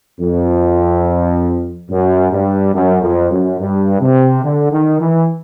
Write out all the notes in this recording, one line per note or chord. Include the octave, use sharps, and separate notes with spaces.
F2
F#2
G2
F#2
F2
F#2
G2
C3
D3
D#3
E3